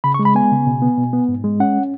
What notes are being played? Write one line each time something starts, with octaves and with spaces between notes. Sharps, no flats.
C#3 B5
C#6
G#3
B5
B3 G#5
C#3
B2
B3
B2
B3
G#2
G#3
C#4 F#5